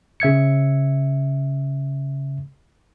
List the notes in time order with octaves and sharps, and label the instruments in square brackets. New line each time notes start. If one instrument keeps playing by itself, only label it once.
[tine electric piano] C#3 E5 G#6 C#7